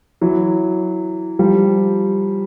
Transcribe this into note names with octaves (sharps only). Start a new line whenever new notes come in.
E3 F#3
F3 G3